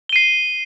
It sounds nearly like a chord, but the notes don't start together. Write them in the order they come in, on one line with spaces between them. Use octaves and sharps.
G7 D#7 C7